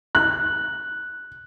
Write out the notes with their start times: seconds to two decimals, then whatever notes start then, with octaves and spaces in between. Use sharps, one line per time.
0.15 F#6